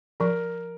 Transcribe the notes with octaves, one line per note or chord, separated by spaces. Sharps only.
F3 A#4